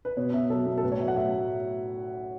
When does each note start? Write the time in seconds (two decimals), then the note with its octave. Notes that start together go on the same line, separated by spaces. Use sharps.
0.05 B4
0.17 B2 C#5
0.33 B2 E5
0.50 F#3 A4
0.66 B2
0.78 A4
0.83 A2 B4
0.92 C#5
1.00 F#3 E5
1.08 F#5
1.17 A2 E5